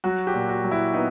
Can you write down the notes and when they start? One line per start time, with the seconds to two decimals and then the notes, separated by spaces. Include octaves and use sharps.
0.04 F#3 F#4
0.27 G4
0.34 A#2
0.49 F#4
0.64 F#3
0.71 E4
0.94 B3 D#4